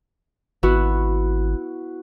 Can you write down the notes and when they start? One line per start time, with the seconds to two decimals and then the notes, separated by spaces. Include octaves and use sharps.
0.63 G#1 B3 E4 F#4